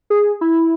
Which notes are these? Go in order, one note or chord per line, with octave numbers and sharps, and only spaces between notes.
G#4
E4